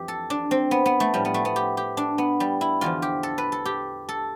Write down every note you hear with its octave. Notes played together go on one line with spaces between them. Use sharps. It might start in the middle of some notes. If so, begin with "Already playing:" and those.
Already playing: F2 E3 G4
A4
D4
C4
B3
B3
A3
A2 F3 G3
B3
A3
B3
G4
G4
D4
B3
G3
E4
E2 D3 F3 F4
G4
A4
B4
A4
G4
A4